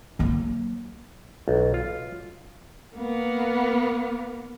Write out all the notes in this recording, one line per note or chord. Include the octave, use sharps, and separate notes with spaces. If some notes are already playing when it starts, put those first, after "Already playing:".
F#3 A#3
B1
F4
A#3 B3